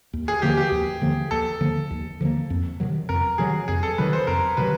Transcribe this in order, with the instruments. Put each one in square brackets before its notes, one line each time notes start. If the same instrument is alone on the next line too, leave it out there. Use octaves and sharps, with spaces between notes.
[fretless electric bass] D#2
[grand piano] G#4
[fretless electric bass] D3 F3 A#3 [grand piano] G4
[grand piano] G4
[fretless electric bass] D#2
D3 F3 A#3
[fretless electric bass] D#2 [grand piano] A4
[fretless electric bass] D3 F3 A#3
D#2
D3 F3 A#3
F2
C3 D#3 F#3
[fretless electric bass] F2 [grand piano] A#4
[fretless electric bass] C3 D#3 F#3 [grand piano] G#4
[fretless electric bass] F2 [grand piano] G#4
[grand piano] A4
[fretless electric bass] C3 D#3 F#3 [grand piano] B4
[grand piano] C5
[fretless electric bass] F2 [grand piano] A#4
[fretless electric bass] C3 D#3 F#3 [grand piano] B4